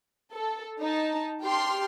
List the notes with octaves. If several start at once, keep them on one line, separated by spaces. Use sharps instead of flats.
A4
D#4 A5
G4 G5 A5 C6 F6